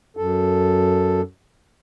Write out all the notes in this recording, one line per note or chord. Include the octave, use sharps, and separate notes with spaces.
F#2 A4